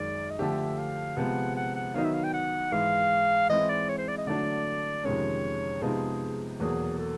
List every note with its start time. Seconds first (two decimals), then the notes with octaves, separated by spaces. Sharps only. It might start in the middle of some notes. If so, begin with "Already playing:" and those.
Already playing: F#2 D#3 G#3 D5
0.30 D#5
0.39 D3 F3 A3 D4 G4 E5
0.78 F5
1.17 C3 F3 G#3 B3 F#5
1.56 F#5
1.75 F#5
1.94 D#3 F#3 B3 D#4 F5
2.04 E5
2.13 F5
2.23 G5
2.33 F#5
2.72 G#2 E3 G#3 F5
3.49 E3 G#3 C4 E4 D#5
3.69 D5
3.88 C#5
3.98 C5
4.08 D5
4.17 D#5
4.27 D3 F#3 A3 D4 D5
5.04 F2 C3 D#3 G#3 C#4 C#5
5.82 C3 F3 G#3 B3 D#4 G#4
6.60 E2 B2 F#3 A#3 G#4
6.99 A4